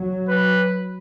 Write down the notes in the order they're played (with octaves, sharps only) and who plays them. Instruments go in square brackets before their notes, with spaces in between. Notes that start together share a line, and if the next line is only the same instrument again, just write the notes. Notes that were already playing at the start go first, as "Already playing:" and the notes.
Already playing: [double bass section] F#3
[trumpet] B4